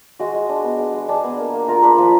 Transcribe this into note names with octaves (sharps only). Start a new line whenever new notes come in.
G#3 F#4
G#3
D4
B3
G#3
G#3
D4 G#4
B3
A#3
A#3
F4 A#4
D4 B4
F3 B4